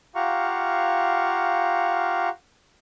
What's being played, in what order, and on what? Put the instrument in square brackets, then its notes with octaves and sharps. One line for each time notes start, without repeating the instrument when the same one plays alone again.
[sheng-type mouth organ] F4 G4 F5 F#5 A#5 C#6